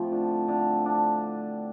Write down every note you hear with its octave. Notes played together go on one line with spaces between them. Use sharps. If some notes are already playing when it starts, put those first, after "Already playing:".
Already playing: A2 F3 C4
D3
D3
D4